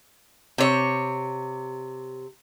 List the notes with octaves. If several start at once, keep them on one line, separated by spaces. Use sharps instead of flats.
C3 C#5